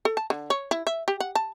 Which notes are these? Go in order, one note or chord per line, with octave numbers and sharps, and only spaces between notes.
A4
A5
D3
C#5
E4
E5
G4
F#5
A5